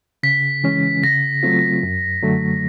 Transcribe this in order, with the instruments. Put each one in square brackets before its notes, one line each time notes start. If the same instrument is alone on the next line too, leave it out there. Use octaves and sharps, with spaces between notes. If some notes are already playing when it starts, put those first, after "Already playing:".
[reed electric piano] C#3 [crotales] B6
[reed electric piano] E3 G#3 C#4
[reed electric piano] C#3 [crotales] A#6
[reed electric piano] F#3 A3 C4 F4
F#2
D3 F#3 A3